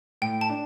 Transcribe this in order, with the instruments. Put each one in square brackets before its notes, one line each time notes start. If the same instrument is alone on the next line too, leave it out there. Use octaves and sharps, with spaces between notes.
[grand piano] A2 [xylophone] G5
[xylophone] A5
[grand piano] D4